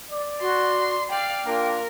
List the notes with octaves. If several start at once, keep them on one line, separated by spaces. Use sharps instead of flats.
D5
F#4 C6
D5 F5 G5
A#3 D4 F4 A#4